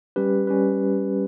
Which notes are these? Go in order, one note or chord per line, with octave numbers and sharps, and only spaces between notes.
G3 C#4 G4 B4
G3 C#4 G4 B4